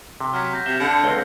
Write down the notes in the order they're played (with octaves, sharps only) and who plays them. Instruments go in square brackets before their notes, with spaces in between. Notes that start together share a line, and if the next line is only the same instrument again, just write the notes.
[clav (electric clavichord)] C3
[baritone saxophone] F#3 [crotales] F6 B6
[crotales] F#6 G6 A#6
[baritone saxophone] C3 [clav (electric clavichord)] E5 [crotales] G7
[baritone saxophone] D3 [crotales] G#6 C#7 D7
[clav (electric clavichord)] C#2 C4 [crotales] B6 G7